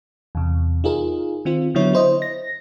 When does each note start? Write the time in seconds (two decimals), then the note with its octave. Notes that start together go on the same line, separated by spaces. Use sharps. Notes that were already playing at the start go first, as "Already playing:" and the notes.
0.35 E2 C3
0.84 D#4 F4 G#4 A#4
1.45 D#3 C4 F4
1.75 D3 F#3 B3 E4 C#5
1.93 E4 C5 D#5
2.22 A#6